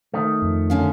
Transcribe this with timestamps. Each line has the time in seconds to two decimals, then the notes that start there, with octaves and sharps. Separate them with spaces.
0.14 D#3 A3
0.42 F2
0.70 D3 C#4 F5